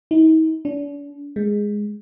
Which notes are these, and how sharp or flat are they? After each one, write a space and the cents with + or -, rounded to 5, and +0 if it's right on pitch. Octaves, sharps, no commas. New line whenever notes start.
D#4 +45
D4 -40
G#3 -5